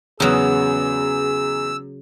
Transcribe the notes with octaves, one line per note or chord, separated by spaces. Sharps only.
E2 C#3 F#3 B3 G#4 E6